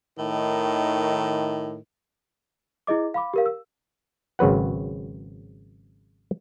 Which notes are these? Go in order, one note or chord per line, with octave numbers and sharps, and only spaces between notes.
A2 D#3
E4 G#4 D#5 D6
F5 B5 D6
G4 A#4 F5
E6
G#1 C#3 F#3 B4 F#5